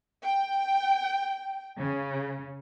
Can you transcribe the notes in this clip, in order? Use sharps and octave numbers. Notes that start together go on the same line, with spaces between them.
G5
C#3